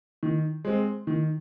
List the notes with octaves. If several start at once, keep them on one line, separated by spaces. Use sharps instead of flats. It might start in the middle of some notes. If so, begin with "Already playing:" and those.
D#3
G#3 C4
D#3